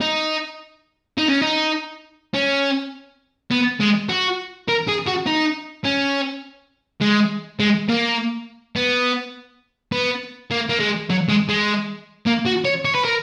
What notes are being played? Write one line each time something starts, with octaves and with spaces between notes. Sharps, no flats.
D#4
D#4
C#4
D#4
C#4
B3
G#3
F#4
A#4
G#4
F#4
D#4
C#4
G#3
G#3
A#3
B3
B3
A#3
A#3
G#3
F#3
G#3
G#3
A#3
F#4
C#5
C#5
B4
A#4